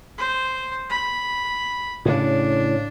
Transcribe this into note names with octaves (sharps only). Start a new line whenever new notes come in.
C5
B5
A2 C#3 D4